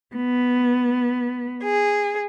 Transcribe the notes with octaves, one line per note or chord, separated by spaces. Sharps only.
B3
G#4